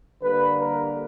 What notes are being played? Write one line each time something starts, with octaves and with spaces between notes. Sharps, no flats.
D3 G3 A#3 B4
A#4